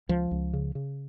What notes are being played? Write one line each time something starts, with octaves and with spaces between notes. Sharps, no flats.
C#2 F3
C#2
C#3
C#3